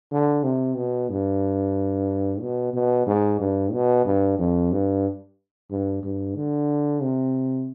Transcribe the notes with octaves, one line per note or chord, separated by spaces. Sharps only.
D3
C3
B2
G2
B2
B2
G#2
G2
B2
G2
F2
G2
G2
G2
D3
C3